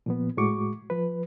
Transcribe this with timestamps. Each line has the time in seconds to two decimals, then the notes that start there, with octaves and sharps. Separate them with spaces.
0.06 A#2 F3 B3
0.37 A2 G#3 F#4 C#6 D6
0.90 F3 B4